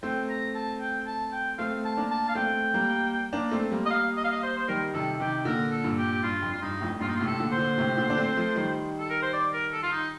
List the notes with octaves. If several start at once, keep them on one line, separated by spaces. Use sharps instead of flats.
A3 C4 G5
A#5
A5
G5
A5
G5
A3 C4 F5
A5
A#3 D4
A5
F5
A3 C4 G5
G3 A#3
A#3 D4
A3 C4
G3 A#3
D#5
F5
D#5
F5
D#5
C5
C5
D#3 G3 A#4
C3 D#3 A4
C3 D#3 G4
A#2 D3 A#4
A4
G2 A#2
G4
G4
G2 F4
F2
F4
G2 D#4
F2 A2
G2 A#2 F4
D#4
F4
A2 C3
A4
A#2 D3
C5
A#2 D3
A2 C3
A#2 D3
D4
A3 C4
F3 A3
D#3 G3
A4
A#4
C5
D5
A#4
A4
F4
D#4